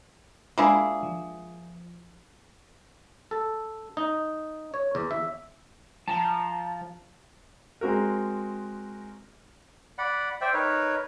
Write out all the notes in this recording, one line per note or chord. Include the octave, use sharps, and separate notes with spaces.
G#3 A#3 D4 E4 F4 G#4
F3
A4
D#4
C#5
E2
E5
F3 A5 A#5
G#3 C4 F#4 A#4
D5 F#5 B5
C5 D5 E5 G5
D#4 A#4 B4 C#5